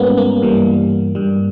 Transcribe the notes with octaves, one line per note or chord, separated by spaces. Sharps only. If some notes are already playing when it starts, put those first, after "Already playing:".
Already playing: G#2 G3 A#3 B3 C#4
A#3
G2 E3 G3
G2 G3